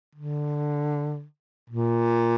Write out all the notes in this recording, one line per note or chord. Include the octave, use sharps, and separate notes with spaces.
D3
A#2